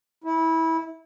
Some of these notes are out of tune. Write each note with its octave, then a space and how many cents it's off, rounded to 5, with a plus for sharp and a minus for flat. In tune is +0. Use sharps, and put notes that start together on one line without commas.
E4 -20